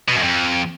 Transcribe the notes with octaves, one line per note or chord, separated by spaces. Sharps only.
B2
F#2
F2